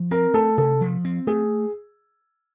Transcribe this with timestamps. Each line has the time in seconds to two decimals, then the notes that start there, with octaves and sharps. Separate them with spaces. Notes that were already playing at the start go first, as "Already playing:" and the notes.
Already playing: F3
0.11 C4 A#4
0.34 A3 A4
0.57 C3 A4
0.81 F3
1.05 C4
1.27 A3 G#4